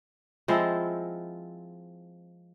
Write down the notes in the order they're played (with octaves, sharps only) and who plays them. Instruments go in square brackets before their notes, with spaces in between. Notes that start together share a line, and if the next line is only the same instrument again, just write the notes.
[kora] F3 G#3 C4 E4